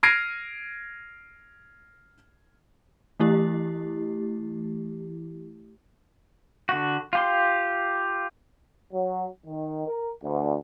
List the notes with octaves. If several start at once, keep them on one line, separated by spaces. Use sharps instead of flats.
F6 G#6 A#6 C7 D7 D#7
E3 A3 E4 G4
D3 F#4
F4 G4 C6
F#3
D#3
A#4
D2